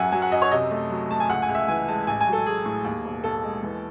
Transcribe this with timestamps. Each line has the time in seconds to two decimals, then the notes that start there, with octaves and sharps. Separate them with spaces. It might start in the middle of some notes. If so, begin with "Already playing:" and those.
Already playing: F#2 F#3 E5 F#5 G#5
0.12 F#3 G#5
0.22 F#5
0.32 F#2 D#5
0.42 C#5
0.51 C3 D#5
0.71 A3
0.90 F#3
1.10 A3 A5
1.20 G#5
1.29 C#2 F#5
1.42 G#5
1.49 C#2
1.55 E5
1.68 E3 G#5
1.88 G#3 A5
2.07 A1 G#5
2.21 G#5
2.27 F#3
2.33 A4
2.46 F#3 G#4
2.66 A2
2.84 D#2
3.04 E1
3.24 D#2 A4
3.44 G#3
3.63 E3